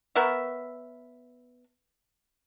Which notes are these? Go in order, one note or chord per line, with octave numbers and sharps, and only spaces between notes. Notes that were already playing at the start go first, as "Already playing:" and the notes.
B3 A#4 C#5 E5